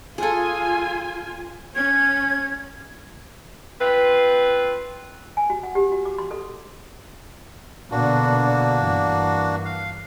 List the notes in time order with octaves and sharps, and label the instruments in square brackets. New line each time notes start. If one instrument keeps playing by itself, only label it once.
[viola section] F4 G#5 [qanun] G#4 A4
[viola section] C#4 [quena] G#6
[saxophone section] C4 F4 B4
[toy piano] G#5
F#4
F#5
G4
F#4
D6
C6
A4
[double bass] B2 D3 [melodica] A#3 D4 F#4
[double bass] G2 E3
[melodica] F5